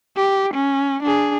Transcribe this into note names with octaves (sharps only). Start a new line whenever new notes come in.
G4
C#4
D4 G#4